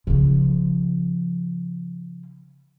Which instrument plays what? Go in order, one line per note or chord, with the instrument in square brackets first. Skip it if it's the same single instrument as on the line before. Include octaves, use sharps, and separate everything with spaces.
[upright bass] C#3 F3